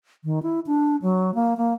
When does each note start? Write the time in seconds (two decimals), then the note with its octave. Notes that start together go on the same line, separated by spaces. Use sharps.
0.24 D#3
0.43 E4
0.67 D4
1.02 F#3
1.35 A#3
1.57 A#3